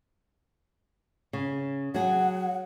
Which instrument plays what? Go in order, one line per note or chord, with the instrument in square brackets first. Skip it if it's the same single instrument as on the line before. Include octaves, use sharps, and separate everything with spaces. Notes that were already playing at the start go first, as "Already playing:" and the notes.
[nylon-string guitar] C#3
[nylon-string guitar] F#3 G#4 [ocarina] F#5